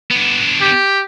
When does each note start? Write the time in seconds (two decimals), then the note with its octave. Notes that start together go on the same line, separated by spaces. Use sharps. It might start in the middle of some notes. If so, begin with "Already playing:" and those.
0.11 B3 D4
0.61 G4